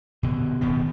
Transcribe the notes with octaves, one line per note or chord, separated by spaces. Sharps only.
B2 D3
D1 B2 D#3 B3